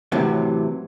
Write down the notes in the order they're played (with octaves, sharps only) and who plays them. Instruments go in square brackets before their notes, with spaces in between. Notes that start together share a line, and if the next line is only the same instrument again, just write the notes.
[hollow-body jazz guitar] A2 C3 E3 F#3